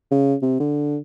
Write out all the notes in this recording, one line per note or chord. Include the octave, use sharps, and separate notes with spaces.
C#3
C3
D3